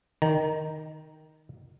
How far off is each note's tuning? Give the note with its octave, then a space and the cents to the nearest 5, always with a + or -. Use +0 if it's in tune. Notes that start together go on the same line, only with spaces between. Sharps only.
D#3 +0 A#5 +0